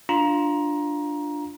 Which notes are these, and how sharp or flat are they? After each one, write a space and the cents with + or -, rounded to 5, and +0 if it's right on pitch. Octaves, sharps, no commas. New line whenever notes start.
D4 +0 F4 +0 A#5 +20